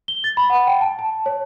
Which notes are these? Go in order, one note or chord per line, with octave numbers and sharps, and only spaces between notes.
G7
A6
B5
F#5
G5
A5
A5
C#5